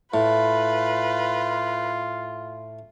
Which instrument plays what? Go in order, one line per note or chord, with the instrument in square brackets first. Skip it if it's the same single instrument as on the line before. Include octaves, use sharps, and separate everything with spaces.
[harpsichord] A2 [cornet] F4 [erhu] B4